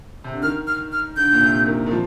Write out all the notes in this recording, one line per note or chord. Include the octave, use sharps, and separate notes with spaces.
C3
D3
D#3 F6
F6
F6
D3 G6
A#2
C3
D#3
D#3
F3